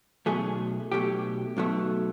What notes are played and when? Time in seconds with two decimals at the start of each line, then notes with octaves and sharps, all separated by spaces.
0.26 B1 B2 F#3 A3 G#4
0.92 B1 B2 F#3 A3 G4
1.57 B1 B2 F#3 A3